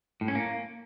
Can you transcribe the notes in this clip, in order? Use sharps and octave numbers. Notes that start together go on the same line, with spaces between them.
A2
C#4
A#3